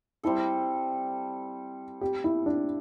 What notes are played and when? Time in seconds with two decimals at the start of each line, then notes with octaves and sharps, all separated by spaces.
0.23 G3 C4 E4 A4
2.01 G4
2.24 E4
2.46 D4